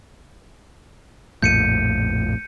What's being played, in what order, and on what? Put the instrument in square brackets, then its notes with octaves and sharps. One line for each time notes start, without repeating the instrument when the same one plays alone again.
[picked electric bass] A#1 F2 A2 [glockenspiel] G6 C#7 D#7